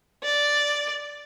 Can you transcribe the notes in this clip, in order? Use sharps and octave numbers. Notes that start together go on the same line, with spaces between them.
D5